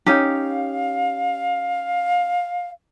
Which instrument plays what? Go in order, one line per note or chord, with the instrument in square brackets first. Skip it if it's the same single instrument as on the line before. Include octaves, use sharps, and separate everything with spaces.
[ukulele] C#4 D#4 G4 [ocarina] F5